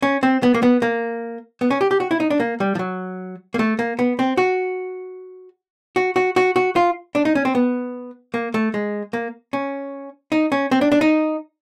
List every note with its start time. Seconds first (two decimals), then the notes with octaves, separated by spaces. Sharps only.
0.02 C#4
0.23 C4
0.43 B3
0.54 A#3
0.63 B3
0.82 A#3
1.61 B3
1.70 C#4
1.81 G4
1.91 G4
2.00 F#4
2.11 E4
2.20 D#4
2.30 D4
2.40 A#3
2.60 G3
2.75 F3
2.79 F#3
3.54 A#3
3.59 A3
3.79 A#3
3.99 B3
4.19 C4
4.37 F#4
5.96 F#4
6.16 F#4
6.36 F#4
6.56 F#4
6.76 F4
7.15 D4
7.25 D#4
7.35 C#4
7.45 C4
7.55 B3
8.34 A#3
8.54 A3
8.74 G#3
9.13 A#3
9.53 C#4
10.32 D#4
10.52 C#4
10.71 C4
10.81 D4
10.92 D4
11.01 D#4